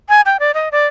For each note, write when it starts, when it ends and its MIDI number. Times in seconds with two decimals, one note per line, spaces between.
0.09 0.21 80
0.26 0.37 79
0.40 0.51 74
0.54 0.69 75
0.72 0.86 74